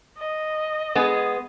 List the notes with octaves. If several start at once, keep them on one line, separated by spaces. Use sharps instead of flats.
D#5
G#3 B3 G#4